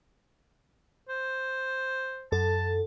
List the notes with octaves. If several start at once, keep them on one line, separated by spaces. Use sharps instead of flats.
C5
F#2 A4 A5